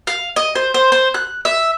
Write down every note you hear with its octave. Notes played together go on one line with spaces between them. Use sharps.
F5
D#5
C5
C5
C5
F#6
E5